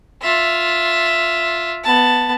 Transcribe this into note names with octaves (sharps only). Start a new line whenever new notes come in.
F4 E5
B3 A5